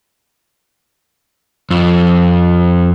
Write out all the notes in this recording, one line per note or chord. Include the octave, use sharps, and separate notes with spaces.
F2